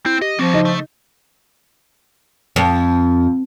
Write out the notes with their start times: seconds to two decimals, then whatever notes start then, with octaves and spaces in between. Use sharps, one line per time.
0.06 C4 E4 C5
0.22 G4 D#5
0.39 F3 G3 C4 F#4
0.54 C#3 D#4
0.65 A3
2.56 F2